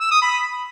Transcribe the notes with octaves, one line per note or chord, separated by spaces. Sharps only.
E6
D#6
B5